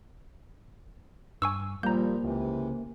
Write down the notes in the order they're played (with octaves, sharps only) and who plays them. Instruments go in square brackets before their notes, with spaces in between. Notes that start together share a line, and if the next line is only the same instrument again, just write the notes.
[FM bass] G2 [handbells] G#5 C#6 E6
[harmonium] A#2 F3 [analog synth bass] G3 [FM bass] A#3 [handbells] A#5 G6
[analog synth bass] C#2 [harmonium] C3 E3